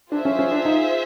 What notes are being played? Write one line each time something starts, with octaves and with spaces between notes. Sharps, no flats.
D4 F4 G#4 C5 E5
C#4
C#4
D4
D#4